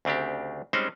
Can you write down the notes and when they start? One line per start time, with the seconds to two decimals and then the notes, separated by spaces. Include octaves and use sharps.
0.05 D2 C#3 C4 D4 G4
0.73 G3 G#3 C4 C#4 D#4 C5